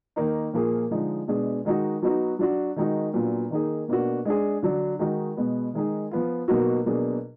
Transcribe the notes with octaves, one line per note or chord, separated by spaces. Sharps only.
D#3 A#3 D#4
A#2 F3 A#3 F4 G#4
D3 F3 G#3 D#4
B2 G#3 D4 G#4
D#3 G#3 D#4 F#4
F#3 B3 D#4 F#4
F#3 D4 F#4
D#3 G#3 D#4 F#4
A#2 F#3 B3 D4 F4
D#3 A#3 D#4 G#4
B2 A#3 D4 F#4
G#3 D4 G#4
D3 F#3 D4
D#3 G#3 D#4 F#4
B2 G#3 B3
D#3 G#3 D#4 G#4
F3 B3 F4
B2 F#3 A#3 D#4 F#4
B2 F#3 A#3 D4 G#4